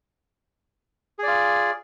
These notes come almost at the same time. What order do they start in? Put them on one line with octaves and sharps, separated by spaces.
G#4 D5 F4